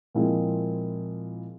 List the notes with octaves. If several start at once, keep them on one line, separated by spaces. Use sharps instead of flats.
A#2 F3 G#3 C4 E4